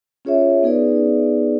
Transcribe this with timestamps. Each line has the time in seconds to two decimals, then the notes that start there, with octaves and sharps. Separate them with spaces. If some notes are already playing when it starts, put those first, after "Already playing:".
0.25 C#4 F4 G#4 C#5 E5
0.63 B3 D#4 G#4 B4 D5